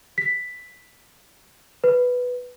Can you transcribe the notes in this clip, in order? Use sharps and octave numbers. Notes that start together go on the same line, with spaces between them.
B6
B4